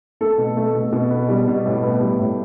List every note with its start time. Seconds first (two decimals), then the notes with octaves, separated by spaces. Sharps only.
0.21 A3 A4
0.38 B2
0.57 A3
0.75 B2
0.93 B2
1.10 B3
1.29 G3
1.48 B2
1.66 A2
1.84 B3
2.01 G3
2.19 A2